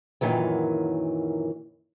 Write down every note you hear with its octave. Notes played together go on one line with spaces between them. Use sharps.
F#2 A#2 D#3 E3 F#3